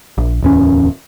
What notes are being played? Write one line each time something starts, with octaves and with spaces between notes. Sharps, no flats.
A#1
D1 E2 C#4